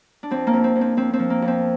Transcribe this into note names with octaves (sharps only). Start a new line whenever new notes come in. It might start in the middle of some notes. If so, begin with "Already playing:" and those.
D4
F2 C4
A#3
F2
C4
F2
C4
F2 C4
C4
F3
A#3
F2
C4